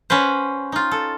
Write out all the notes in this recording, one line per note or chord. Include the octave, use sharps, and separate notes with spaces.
C#4 F#4 B4 C5
D#4 F4
A4